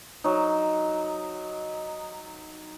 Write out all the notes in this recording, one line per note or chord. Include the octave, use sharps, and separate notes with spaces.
F#3 D#4